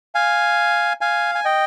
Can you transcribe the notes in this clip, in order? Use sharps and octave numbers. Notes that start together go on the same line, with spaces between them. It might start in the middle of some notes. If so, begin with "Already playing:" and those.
F5 G#5
F5 G#5
G#5
D#5 G5